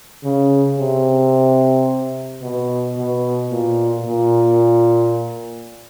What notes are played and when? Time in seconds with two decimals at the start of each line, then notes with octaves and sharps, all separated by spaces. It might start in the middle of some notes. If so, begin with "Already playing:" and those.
0.24 C#3
0.79 C3
2.42 B2
2.97 B2
3.50 A#2
4.05 A#2